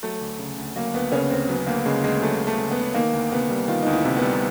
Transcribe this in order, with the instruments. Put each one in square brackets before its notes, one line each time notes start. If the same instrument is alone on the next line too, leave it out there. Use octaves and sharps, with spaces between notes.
[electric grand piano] F#3 [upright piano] A3
[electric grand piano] D2
C#3
D2
[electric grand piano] F#3 [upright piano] A#3
[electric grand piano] D2 [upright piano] B3
[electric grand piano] C#3 [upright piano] C#4
[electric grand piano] D2 [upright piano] C4
[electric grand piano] F#3 [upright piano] B3
[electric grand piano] D2 [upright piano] A#3
[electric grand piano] C#3 [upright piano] G#3
[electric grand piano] D2 [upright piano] G#3
[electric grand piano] F#3 [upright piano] A3
[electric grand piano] D2
[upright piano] A3
[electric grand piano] C#3
[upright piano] B3
[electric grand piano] D2
[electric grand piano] D#3 [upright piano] A#3
[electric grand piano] D2
[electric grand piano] C3 [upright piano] B3
[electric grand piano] G3
[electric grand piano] D#3 [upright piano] F4
[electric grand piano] D2 [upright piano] D#4
[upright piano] E4
[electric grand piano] C3
[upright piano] B3
[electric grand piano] G3